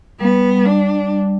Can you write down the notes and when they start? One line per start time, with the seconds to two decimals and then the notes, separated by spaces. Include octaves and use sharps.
0.20 G3 B3
0.65 D4